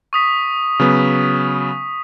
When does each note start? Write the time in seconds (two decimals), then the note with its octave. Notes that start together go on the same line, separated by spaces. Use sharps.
0.13 C#6 D#6 B6
0.80 C#3 F#3 B3